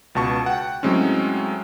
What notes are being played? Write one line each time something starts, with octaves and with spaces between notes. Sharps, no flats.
C#2 B2 A5 C#6
F#5 G5
A2 F#3 G#3 C4 C#4